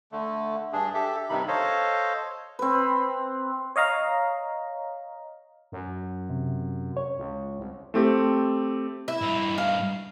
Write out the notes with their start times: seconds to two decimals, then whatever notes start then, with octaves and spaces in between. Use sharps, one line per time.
0.12 D3 A3
0.73 G2 D4 G#4
0.94 G4 A4 E5
1.29 G2 C3 D#3 D#4 B5
1.48 A4 C5 C#5 D#5 F5
2.59 C4 B4
3.76 C#5 D#5 F5 A#5
5.72 F#2
6.30 C3
6.97 C#5
7.18 C#2
7.59 C2
7.94 A3 C4 G4
9.08 E4
9.22 G2 D#4
9.58 F5